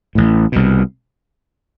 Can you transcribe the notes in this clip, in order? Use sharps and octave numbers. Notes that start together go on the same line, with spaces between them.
A1 A2
C2 B2